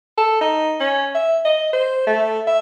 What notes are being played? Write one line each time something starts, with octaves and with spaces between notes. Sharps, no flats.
A4
D#4
C#4
E5
D#5
C5
A3
E5